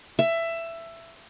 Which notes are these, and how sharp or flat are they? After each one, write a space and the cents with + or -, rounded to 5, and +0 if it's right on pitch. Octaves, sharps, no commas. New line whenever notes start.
E5 +15